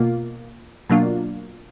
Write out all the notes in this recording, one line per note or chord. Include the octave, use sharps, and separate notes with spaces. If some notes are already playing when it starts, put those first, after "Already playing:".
Already playing: B2 A#3 F4
B2 F#3 A#3 D4 F4